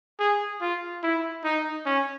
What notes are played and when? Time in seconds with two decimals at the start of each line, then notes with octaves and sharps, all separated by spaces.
0.20 G#4
0.61 F4
1.03 E4
1.44 D#4
1.86 C#4